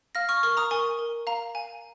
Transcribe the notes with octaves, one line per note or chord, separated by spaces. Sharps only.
F5 F6 A#6
C#6 F6
A#4 C#6 F6
A#5 D#6
A#4 G#5 C#6
A#4
F5 A#5
F5 G#5